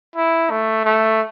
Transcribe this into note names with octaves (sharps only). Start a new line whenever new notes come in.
E4
A3
A3